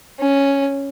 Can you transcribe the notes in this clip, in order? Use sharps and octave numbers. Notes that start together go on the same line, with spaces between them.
C#4